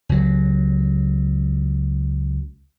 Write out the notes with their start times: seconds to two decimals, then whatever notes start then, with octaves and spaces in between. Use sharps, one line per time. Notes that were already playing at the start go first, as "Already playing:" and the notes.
0.09 C#2 F#3